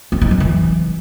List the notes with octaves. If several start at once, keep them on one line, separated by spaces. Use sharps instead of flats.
C4
D#4
F#3
E3